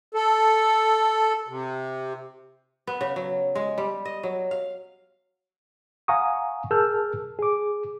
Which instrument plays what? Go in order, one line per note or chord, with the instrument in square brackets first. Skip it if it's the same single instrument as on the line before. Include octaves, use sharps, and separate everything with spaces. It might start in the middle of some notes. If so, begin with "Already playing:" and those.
[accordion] A4
C3
[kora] B3
C#3
F#3
G#3
G3
D#5
F#3
F5
[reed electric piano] F5 F#5 G#5 A#5 C#6 D#6
G#4 A#4 A5 E6 F6 G6
G#4 D6